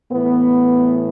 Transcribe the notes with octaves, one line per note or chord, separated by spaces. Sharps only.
A2 E3 B3